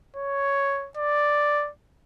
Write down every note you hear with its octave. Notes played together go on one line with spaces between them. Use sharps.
C#5
D5